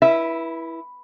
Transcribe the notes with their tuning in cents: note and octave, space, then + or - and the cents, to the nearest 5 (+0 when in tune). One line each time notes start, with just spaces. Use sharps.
E4 +0 B4 -30 E5 +0